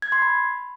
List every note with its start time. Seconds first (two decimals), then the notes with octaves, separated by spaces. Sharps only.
0.02 G#6
0.12 C6
0.22 B5